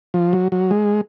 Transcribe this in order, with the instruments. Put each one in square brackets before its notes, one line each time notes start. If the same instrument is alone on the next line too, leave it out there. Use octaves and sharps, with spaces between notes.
[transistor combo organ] F3
F#3
F#3
G#3